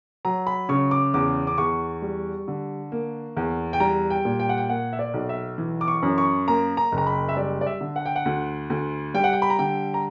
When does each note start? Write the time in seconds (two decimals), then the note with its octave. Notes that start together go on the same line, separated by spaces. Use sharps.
0.25 F#3 A#5
0.47 B5
0.69 C#3 C#6
0.91 D6
1.14 E2 D6
1.47 D6
1.58 E2 C#6
2.02 G3
2.48 D3
2.92 A#3
3.37 E2
3.73 G5
3.80 G3 A#5
4.10 G5
4.25 A#2
4.40 G5
4.49 F#5
4.57 G5
4.69 A#3 F#5
4.93 E5
4.99 D5
5.14 B1
5.29 E5
5.58 E3
5.81 D6
5.88 C#6
6.03 F#2
6.18 C#6
6.48 A#3 A#5
6.77 A#5
6.92 F#1
6.98 A#5
7.07 B5
7.29 E5
7.36 G3 D5
7.61 D5
7.67 E5
7.81 D3
7.96 F#5
8.06 G5
8.16 F#5
8.26 D2
8.70 D2
9.14 G3 G5
9.24 F#5
9.33 G5
9.42 B5
9.50 A#5
9.59 D3 G5
9.94 A#5